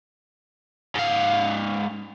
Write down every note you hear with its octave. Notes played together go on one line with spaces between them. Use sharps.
G#2 F5